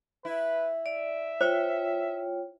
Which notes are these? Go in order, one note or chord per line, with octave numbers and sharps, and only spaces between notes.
E4 B4
D5 E5
F4 C5 C#5 G5